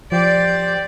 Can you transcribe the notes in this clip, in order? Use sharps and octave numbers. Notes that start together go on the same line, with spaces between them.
F3 G4 C5 D5